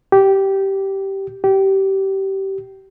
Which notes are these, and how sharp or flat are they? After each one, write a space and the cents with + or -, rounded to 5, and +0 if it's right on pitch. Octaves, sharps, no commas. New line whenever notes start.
G4 -10
G4 -20